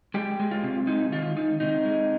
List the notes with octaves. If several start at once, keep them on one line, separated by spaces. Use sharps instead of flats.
G#3 G4
G#3
F4
C3
G#3 D#4
D#3 F4
D#3 D#4
C3 D#4
G#3